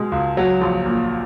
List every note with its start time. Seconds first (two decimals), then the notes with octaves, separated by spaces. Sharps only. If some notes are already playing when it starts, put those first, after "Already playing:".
Already playing: B2 G#3
0.12 C#2
0.37 F#3
0.61 A#1
0.86 A#2